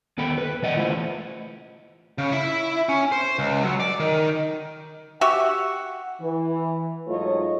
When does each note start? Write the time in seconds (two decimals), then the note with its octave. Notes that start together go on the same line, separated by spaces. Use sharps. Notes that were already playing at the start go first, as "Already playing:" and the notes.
0.18 D#2 B3 A4 G5 B5
0.38 B4
0.62 C#3 E3 D5 D#5 F#5
0.77 E3 A3 E4 F4 C5
2.18 C#3
2.32 E4
2.89 C#4
3.12 C5
3.39 C#2
3.64 F#3
3.80 D5
4.00 D#3
5.21 F#4 G4 E5 F#5
6.21 E3
7.08 G#2 F#3 A3 F4 C#5 D#5